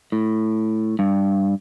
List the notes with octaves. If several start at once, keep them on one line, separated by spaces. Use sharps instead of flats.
A2
G2